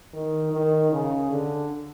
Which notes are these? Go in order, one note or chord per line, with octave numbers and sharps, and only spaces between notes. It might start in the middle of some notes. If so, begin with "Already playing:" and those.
D#3
D#3
C#3
D3